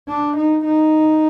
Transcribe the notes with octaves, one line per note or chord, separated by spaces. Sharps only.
D4
D#4
D#4